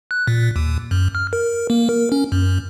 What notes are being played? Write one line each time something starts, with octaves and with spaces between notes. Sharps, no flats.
F#6
A#2
D#2
F#2
F6
A#4
A#3
A#4
C#4
F#2